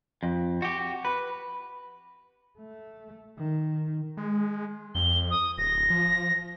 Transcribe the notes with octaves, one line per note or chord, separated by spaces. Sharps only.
F2
F#4 G4
B4
A3
D#3
G#3
F2 G7
D#6
D1 A#6
F3